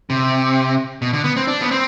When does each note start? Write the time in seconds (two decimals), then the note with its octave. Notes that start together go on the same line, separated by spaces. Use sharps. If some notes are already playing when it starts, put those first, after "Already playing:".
0.10 C3
1.02 B2
1.13 D3
1.24 B3
1.37 C4
1.47 D4
1.62 B3
1.71 C4